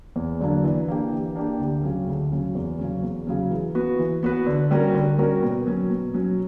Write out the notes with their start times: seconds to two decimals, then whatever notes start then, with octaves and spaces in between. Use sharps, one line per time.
0.16 E2
0.40 D3 F#3 A#3 D4
0.64 E3
0.88 A#3 D4 G4
1.12 E3
1.35 A#3 D4 G4
1.59 D2
1.83 C#3 F#3 C#4
2.07 D2
2.31 C#3 F#3 C#4
2.55 E2
2.79 C#3 F#3 C#4
3.03 E2
3.27 C#3 F#3 C#4
3.51 E3
3.75 B3 F#4 B4
3.99 E3
4.23 B3 F#4 B4
4.47 D3
4.71 G3 C#4 F#4 A#4
4.94 D3
5.18 G3 C#4 F#4 A#4
5.43 B2
5.67 F#3 C#4
5.90 B2
6.14 F#3 C#4